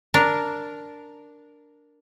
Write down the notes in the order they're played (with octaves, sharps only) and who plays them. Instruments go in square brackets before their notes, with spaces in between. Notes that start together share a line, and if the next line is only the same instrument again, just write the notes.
[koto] D4 A#4